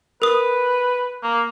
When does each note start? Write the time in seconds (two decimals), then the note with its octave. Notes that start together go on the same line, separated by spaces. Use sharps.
0.22 A#4 B4 D#6
1.23 A#3